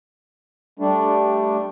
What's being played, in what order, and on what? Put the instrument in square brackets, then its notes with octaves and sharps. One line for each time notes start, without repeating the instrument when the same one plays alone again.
[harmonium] G3 A3 D4